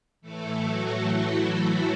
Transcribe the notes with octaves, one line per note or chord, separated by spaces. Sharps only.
A2 E3 A3 A4
F#3 F#4
E3 E4
E3 E4